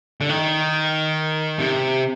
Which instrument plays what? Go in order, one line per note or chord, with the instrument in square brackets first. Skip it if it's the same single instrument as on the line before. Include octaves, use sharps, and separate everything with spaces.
[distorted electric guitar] D3
D#3
C3